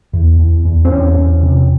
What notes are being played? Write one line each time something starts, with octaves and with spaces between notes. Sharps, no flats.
E2
E2
E2
C4
E2 C#4
E2
C3